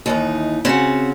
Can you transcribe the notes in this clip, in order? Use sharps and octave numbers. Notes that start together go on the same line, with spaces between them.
D#2 E3 D#4
C#3 C4 F#4 F#5